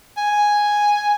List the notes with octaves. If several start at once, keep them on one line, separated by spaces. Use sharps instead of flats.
G#5